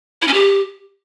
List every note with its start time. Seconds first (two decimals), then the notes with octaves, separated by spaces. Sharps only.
0.22 E4
0.28 C#4
0.33 G4